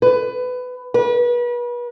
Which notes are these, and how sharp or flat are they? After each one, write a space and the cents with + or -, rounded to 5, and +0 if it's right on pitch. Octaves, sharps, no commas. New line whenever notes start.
B4 +20
B4 -35